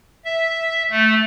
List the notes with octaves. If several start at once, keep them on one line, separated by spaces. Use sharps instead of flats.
E5
A3